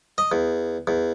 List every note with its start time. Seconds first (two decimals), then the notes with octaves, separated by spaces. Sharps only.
0.18 D#5
0.32 E2
0.87 E2